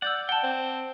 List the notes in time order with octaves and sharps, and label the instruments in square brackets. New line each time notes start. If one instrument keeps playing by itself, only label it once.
[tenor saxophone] D5 [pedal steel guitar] F#5 [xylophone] E6 G6 A6
[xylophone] F#5 A5 [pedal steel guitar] G5
[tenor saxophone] C4